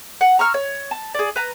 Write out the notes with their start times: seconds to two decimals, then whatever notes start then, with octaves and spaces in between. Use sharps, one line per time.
0.21 F#5
0.39 A#5 C#6 E6 F6
0.54 C#5
0.91 A5
1.14 G#4 D5
1.36 B4 A#5